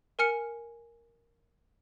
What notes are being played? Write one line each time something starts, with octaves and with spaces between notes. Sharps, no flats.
A#4 G#5 F6 C#7